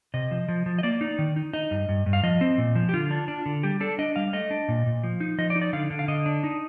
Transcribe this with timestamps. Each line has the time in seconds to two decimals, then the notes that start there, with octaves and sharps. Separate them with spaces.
0.14 C3 D#5
0.31 F3
0.48 F3
0.66 F3
0.79 D#5
0.83 A#3 D5
1.01 D#4
1.19 D#3
1.36 D#4
1.53 D#4 D#5
1.71 G2
1.89 G2
2.06 G2
2.13 F5
2.23 F3 D#5
2.41 C4
2.58 A#2
2.75 F3
2.89 G4
2.94 D3 F4
3.11 D4
3.28 D4
3.46 D3
3.63 G3 G4
3.80 D4 A4
3.99 D4 D#5
4.16 G3 F5
4.33 A3 D#5
4.51 D4
4.68 A#2
4.86 A#2
5.03 F3
5.20 D#4
5.38 F3 D#5
5.50 D5
5.56 D#4
5.61 D5
5.73 D3 F5
5.90 D3
5.99 F5
6.08 D3 D#5
6.26 D4
6.44 D#4